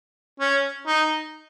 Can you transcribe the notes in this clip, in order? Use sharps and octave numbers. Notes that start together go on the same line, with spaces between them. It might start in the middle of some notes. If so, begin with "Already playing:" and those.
C#4
D#4